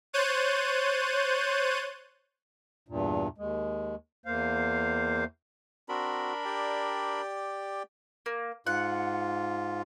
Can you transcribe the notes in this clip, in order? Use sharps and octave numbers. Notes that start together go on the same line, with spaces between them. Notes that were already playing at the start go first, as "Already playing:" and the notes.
C5 C#5 F#6 G6 A6 D#7
E2 G2 A#2
D#2 G#3
E2 A#3 C5 F5
C4 D4 F#4 A#4 B5
G4 D5 G5
A#3
G#2 F4 F#5